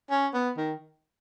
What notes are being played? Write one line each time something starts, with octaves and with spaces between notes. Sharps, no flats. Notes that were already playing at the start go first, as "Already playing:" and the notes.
C#4
B3
D#3